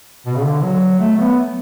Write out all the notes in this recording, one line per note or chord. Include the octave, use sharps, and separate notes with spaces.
B2
C#3
D3
F#3
A3
B3